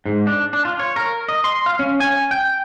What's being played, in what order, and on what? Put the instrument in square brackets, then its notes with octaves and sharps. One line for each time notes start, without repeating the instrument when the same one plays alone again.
[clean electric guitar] G#2
D4
D4
F4
C#5
A#4
D#5
C6
F5
C#4
G#5
G5